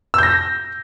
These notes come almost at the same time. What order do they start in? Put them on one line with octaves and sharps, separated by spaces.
E6 G6 A#6